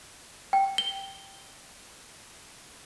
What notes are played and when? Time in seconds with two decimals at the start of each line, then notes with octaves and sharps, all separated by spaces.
0.53 G5
0.78 G7